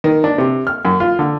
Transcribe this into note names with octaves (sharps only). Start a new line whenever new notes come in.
D#3
D4
C3
F6
F#2
F4
D3